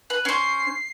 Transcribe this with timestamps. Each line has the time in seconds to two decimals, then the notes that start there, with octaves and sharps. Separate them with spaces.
0.10 B4 F#7
0.25 C#4 C5 C7